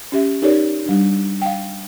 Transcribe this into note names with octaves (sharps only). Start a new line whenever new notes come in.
C#4 G4 E5
D#4 G4 A4 A#4 C#5 D5
G3 D4
F5 G5